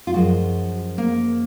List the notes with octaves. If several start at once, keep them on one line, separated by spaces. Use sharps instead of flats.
F4
F#2 F3 G#3 F#4
A#3